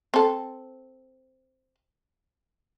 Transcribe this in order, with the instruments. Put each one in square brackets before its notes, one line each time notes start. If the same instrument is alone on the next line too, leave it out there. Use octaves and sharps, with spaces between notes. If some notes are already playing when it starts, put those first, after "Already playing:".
[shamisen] C4 A4